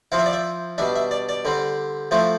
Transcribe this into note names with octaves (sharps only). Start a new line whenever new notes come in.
F3 C4 E4 F5
E5
D5
E5
B2 G3 D4 E5
E5
D5
D5
D3 G3 C4
F3 A3 C4 E4